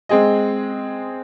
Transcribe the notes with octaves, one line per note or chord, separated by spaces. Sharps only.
G#3 C4 G#4 D#5